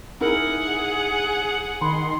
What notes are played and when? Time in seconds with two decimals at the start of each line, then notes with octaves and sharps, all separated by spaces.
0.20 D#4 E4 G#4 A#4 F#5
1.81 D#3 B5 C6